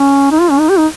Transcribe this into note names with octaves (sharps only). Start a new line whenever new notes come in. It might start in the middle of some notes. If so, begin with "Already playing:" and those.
Already playing: C#4
D#4
F4
C#4
D#4
G4
D#4